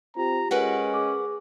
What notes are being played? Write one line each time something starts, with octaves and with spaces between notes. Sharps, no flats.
C4 F4 G4 A#5
G#3 C#4 A#4 B4 F#5
G#4 D6